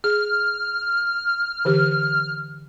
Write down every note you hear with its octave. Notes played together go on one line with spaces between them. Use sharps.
G#4 F6
D3 E3 G4